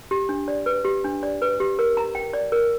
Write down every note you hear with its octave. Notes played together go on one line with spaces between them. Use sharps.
G4
D4
D5
B4
G4
D4
D5
B4
G4
A#4
A#5
G5
D5
A#4